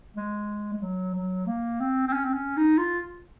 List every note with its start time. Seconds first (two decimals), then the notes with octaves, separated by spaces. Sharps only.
0.16 G#3
0.73 G#3
0.82 F#3
1.14 F#3
1.46 A#3
1.80 C4
2.07 C4
2.13 C#4
2.24 C4
2.34 C#4
2.57 D#4
2.78 F4